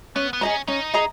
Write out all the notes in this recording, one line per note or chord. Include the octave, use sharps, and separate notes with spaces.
B3 C#4
B3
C#4 G#4 D#5 A#5
C#4 D#4
G#4 D#5 A#5